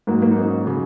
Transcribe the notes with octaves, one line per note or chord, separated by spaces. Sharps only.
G#2 F#3 A#3
A#3
D#4
C#4
C#3 F#3